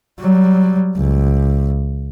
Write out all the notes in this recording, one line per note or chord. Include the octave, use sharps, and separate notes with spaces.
F#3 G3
C#2